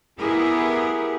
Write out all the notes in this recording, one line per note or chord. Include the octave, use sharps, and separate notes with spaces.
B3 E4 G4 G#4 A#4